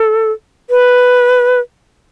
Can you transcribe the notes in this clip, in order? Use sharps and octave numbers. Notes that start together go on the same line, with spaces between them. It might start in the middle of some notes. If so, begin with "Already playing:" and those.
Already playing: A4
B4